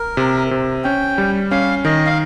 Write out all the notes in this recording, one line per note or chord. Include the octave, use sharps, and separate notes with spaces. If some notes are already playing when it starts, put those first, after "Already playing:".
Already playing: A#4
C3
C3
C#4 G5
G3
C#4 F5
D#3 D#5
F5